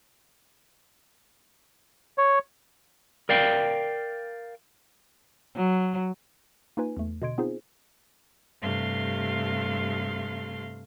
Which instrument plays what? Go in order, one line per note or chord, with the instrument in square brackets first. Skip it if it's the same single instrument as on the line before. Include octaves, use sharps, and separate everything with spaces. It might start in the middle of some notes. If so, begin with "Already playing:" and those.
[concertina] C#5
[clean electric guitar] A#4 D5 F5 G5
[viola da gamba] F#3
[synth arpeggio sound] A#3 D#4 F4 B4 G#5
E2 A3
B2 D3 D#5 C6 G#6 D7
B3 C4 D#4 F4 G#4 C5
[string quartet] G2 C3 A3 F5 C6